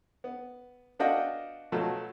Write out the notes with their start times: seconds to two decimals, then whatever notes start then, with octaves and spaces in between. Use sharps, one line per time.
0.24 B3
0.99 B3 D4 F4 F#4 D#5 G5
1.72 B2 F3 F#3 A3